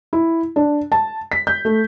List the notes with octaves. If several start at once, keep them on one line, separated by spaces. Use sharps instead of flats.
E4
D4
A5
B6
G6
A3